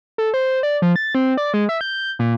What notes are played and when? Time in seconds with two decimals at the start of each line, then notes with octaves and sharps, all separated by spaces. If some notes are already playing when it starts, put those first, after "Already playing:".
0.18 A4
0.34 C5
0.63 D5
0.82 F3
0.96 A6
1.15 C4
1.37 D5
1.54 G#3
1.69 E5
1.81 G6
2.19 A#2